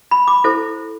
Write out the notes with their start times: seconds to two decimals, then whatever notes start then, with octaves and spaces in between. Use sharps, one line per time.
0.11 B5
0.28 D6
0.44 E4 A4 C5